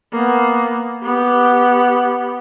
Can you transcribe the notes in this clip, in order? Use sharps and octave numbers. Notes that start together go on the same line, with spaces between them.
A#3 B3
B3 G4